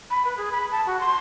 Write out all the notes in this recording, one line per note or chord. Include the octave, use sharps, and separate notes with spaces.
B5
B4
G#4
B5
A5
F#4
C6